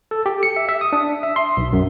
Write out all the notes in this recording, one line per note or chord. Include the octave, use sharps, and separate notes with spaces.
A4
G4
C#7
E5
E5
D#6
D4
E5
C6
B1
F#2